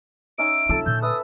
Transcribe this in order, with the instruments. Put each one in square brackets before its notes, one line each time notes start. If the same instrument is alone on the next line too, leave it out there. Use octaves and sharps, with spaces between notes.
[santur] C#4 D#4 E5 [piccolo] D7
[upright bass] C2 F4 [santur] A4 E6
[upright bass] A#2 D3 [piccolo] G6
[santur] B4 E5 [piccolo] D#6